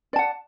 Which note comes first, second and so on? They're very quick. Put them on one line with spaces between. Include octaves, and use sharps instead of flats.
D5 A5 F#5